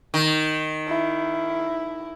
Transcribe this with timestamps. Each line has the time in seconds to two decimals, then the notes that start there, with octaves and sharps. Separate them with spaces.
0.14 D#3
0.88 E4